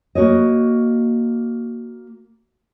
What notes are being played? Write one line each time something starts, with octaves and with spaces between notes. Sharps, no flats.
A#3 F#4 C#5 D#5